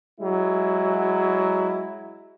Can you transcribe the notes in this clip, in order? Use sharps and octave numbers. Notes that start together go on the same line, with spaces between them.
F#3 G#3 E4